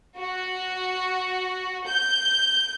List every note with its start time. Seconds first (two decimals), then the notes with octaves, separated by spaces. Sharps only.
0.16 F#4
1.87 G6